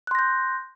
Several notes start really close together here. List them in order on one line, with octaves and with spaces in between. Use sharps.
F#6 C6 A#6 G6